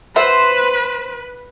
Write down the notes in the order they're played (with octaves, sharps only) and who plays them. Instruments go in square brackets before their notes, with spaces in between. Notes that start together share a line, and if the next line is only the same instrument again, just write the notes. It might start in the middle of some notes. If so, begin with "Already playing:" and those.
[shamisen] F#4 E5 [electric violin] B4 [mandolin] C5